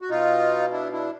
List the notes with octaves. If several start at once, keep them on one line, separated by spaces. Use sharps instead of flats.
F#4
B2 D#4 F4
D4 E4
D4 E4